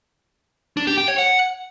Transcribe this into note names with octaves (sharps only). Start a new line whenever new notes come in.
D4
G4
G5
C#5
F#5